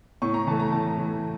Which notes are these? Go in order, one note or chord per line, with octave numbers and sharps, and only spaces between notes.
A2 C#6
A#5
E3 A3 A5
A#5
A2 A5
E3 A3